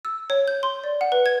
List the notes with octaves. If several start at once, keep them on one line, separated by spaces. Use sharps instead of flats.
E6
C#5
G6
C6
D5
F#5
B4
G#6